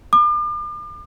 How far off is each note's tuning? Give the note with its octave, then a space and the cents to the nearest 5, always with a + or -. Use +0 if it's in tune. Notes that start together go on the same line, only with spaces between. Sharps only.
D6 +40